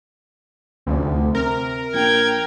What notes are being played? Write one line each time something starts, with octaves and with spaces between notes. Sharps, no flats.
F1 D2
C3 A#4
A#1 G5 G#6